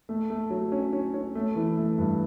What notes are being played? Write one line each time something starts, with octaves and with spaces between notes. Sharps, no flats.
A3
A3
F#3
C#4
C#4
C#4
A3
E3
A3
G2